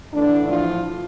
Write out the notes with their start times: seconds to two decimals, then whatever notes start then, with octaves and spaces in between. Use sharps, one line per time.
0.13 A2 D3 E3 D4
0.48 F3 F4